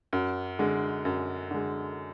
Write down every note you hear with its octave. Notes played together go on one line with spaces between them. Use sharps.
F#2
D3 G#3
F#2
D3 G#3